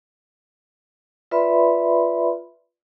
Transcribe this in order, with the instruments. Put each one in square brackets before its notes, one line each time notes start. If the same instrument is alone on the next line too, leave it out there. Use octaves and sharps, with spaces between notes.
[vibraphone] F4 B4 D5 E5 B5 C6